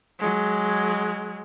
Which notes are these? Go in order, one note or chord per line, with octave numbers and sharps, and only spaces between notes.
F#3 G#3